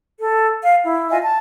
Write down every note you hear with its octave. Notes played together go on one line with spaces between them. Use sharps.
A4
F5
E4
F4 D#5 E5 G#5
A5